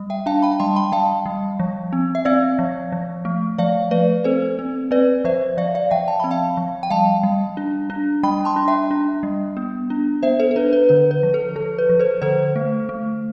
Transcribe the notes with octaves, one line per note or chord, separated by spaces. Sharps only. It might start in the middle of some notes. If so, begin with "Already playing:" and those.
Already playing: G3
E5 G5
D4 F5 A5
G5 B5
G3 A5 C6
G5 B5
G3 F5 A5
G3
F3
C4
E5
C4 D5 F5
F3
F3
A3
F3 D5 F5
A3 B4 D5
C4 A4 C5
C4
C4 B4 D5
F3 C5 E5
F3 D5 F5
D5 F5
F3 E5 G5
A5
C4 B5
F5 A5
F3
G5
G3 F5 A5
G3
D4
D4
G3 G5 B5
A5 C6
D4
E5 G5
D4
G3
B3
D4
B3 C5 E5
A4 C5
A4
D4 B4
B4
D3 B4
B4
F3
A4
F3 A4
B4
F3
A4 C5
D3 A4 C5
A3
A3